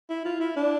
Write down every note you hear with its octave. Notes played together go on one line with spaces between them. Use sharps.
E4
F4
E4
D4